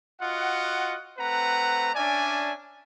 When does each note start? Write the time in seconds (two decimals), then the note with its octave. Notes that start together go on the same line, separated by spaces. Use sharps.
0.21 F4 F#4 D#5 F#5
1.19 A3 C4 B4 F#5 A#5
1.95 C#4 D4 D5 E5 G#5